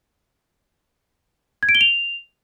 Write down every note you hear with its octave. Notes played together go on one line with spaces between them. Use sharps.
G#6
D7
G7
F7